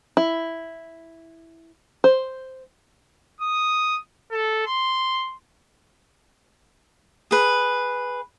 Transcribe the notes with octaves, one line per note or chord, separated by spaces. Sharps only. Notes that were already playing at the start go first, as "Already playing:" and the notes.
E4
C5
D#6
A4
C6
G#4 B4